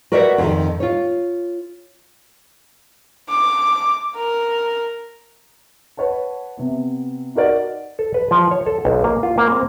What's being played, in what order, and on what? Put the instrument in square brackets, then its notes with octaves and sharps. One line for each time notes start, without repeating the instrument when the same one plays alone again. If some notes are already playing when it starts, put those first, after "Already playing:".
[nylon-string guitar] F#4 A#4 B4 D5 E5 F#5
F2 D#3
F4 C#5
[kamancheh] D6
A#4
[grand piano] B4 C#5 F#5 A5
C3 B3
D#4 F#4 A#4 D5 D#5
[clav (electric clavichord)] A4
B4
F3
C#5
A4
B1
A#3
F4
A#3
C4